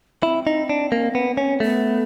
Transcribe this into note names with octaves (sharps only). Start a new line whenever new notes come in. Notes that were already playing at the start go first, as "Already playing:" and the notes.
C4 E4
D#4
D4
A#3
B3
C#4
A3 B3